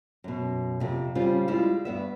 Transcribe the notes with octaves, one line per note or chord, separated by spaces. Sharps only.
F#2 B2
F2 C3
C#3 G3 C4 C#4 F4
G3 G#3 E4 F4
G2 B3 E5